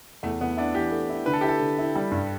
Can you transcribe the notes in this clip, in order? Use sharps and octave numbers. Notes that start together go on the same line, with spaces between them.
E2 A3
E2 B3
D4 E4
E3 G4
A3
E4
D3 B4
A4
E4 G4
A4
D3
E4
G3
G2